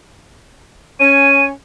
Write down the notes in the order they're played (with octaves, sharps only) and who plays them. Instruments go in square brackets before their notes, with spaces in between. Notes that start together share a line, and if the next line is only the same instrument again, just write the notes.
[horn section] C#4 C#5 G#5 [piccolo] D#7